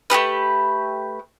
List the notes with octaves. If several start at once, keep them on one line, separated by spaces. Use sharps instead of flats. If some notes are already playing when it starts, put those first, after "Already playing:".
A3 B3 G4 B4